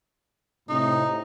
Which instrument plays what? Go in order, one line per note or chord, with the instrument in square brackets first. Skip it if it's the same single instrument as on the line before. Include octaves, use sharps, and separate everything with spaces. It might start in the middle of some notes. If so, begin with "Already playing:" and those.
[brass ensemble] A2 C3 [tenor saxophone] D#4